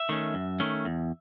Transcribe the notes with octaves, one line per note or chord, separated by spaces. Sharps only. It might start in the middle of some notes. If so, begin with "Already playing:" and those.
Already playing: E5
D#3 A3 C#4
F#2
D#3 A3 C#4
E2